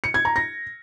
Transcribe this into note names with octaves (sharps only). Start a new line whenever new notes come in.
C#7
G#6
A#5
A#6